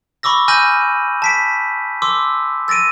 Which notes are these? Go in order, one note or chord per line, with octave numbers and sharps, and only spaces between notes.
B5 C#6 D6 E6 A#6
G#5 F6 G6 A#6 D#7 F#7
A5 B6 D7
C6 D6 E6
E6 A6 A#6 D7 D#7